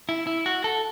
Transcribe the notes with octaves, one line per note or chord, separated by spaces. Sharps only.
E4
E4
F#4
A4